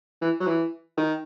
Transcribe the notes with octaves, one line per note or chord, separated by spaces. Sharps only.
E3
F#3
E3
D#3